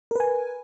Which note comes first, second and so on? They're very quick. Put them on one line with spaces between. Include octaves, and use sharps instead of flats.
A#4 B4 G#5